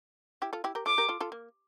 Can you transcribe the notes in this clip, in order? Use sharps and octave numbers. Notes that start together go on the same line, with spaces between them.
E4 G4
F4 A4
E4 G4
G4 A#4
F4 A4 D6
G4 A#4
F4 A4
F4 A4
A#3